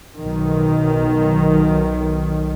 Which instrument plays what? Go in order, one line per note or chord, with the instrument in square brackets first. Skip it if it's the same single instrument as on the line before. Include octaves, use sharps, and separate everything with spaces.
[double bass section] B1 D#3